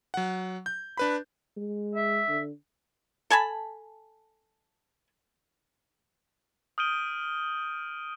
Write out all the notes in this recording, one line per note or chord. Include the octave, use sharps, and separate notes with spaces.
F#3 F#5
G6
D4 B4 B5
G#3
E5
D3
A4 G#5 A5 B5
D#6 F6 G6 D7 D#7 G7